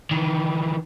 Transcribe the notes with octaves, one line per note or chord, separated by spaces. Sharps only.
D#3 E3